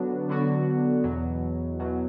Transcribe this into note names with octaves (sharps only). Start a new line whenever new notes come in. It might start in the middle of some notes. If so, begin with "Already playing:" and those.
Already playing: D3 F#3 B3 D4 F#4
D3 F#3 B3 D4 F#4
E2 B2 F#3
E2 B2 F#3